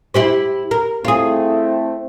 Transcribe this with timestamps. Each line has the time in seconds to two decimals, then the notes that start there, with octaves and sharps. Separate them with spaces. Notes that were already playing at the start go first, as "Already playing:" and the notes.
0.14 E4 G4 C5
0.71 A#4
1.05 A3 C4 E4 F4 G#4